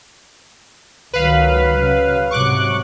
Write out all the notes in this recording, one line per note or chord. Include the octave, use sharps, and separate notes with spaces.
C#2 D#3 F#3 B4 F5
C#3 F#3
G#2 C3 F#3 C#6 D6 F#6